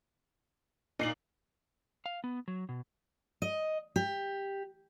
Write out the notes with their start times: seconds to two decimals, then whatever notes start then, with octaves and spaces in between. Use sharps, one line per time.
0.99 A#2 D#4 D#5 C7 F#7
2.06 F5
2.24 B3
2.48 F#3
2.69 B2
3.42 D#5
3.96 G4